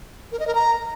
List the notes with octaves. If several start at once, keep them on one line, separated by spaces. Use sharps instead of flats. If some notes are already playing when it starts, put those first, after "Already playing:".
A#4
D#5
A#4
A#5